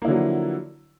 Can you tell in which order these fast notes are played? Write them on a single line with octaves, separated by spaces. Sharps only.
A#3 E4 D3 F#3 F3